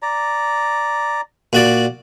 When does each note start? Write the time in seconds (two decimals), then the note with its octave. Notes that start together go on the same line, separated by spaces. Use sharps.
0.02 D5 A#5
1.53 A#2 F#4 D5